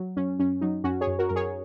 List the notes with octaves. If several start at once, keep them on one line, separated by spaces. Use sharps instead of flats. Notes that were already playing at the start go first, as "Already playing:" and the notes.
Already playing: F#3
F#2 C#4
F#2 C#4
F#3 D#4
F#2 C#4 F#4
G#4 C#5
F#2
F#4 A#4
F#2 A#4
G#4 C#5